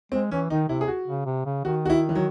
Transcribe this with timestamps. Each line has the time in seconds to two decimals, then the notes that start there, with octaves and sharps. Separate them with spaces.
0.12 G#3 C4
0.31 E3 C#4
0.50 D#3 D#4
0.69 C3 E4
0.81 G#4
0.88 F#4
1.08 C#3
1.26 C3
1.46 C#3
1.65 D#3 F#4
1.85 F#4
1.90 E4
2.09 E3
2.15 F#3